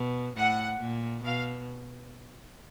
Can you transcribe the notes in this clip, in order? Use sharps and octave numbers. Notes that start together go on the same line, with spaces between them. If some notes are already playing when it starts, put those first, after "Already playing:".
Already playing: B2
A2 F#5
A#2
B2 F5